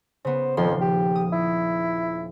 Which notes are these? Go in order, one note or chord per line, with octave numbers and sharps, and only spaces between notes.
C#3 B3 C5
D#1 F2 F3 C6
G4
D#6
E4